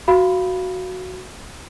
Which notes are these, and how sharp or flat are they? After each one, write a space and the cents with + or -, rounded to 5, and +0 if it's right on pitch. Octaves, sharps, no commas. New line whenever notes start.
F#4 +0 F5 -10 B5 +0